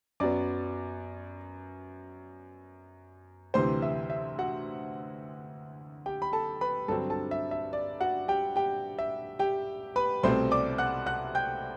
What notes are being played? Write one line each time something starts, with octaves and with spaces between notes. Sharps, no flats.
F#2 F#3 B3 D5 D6
D2 C3 E3 C5 C6
E5
E5
F#4 F#5
G4 G5
B5
A4 A5
B4 B5
G2 D3 F#3 C4 A4 A5
A4 A5
E5
E5
D5
F#4 F#5
G4 G5
G4 G5
E5
G4 G5
B4 B5
C2 B2 A3 C4 C5 C6
D5 D6
F#5 F#6
F#5 F#6
G5 G6